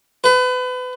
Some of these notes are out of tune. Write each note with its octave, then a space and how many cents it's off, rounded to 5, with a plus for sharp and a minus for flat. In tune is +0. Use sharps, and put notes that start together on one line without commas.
B4 +30